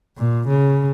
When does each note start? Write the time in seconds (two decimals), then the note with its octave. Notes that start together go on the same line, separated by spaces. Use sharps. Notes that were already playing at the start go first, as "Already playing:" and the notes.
0.18 A#2
0.48 C#3